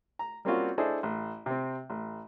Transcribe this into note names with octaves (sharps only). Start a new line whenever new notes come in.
A#5
G3 A#3 C4 C#4 F4 F#4
D4 E4 G#4 A4 C5 D#5
A1
C3 C4
A1